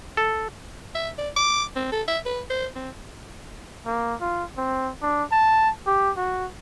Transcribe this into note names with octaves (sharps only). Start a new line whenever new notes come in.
A4
E5
D5
D6
C4
A4
E5
B4
C5
C4
A#3
F4
C4
D4
A5
G4
F#4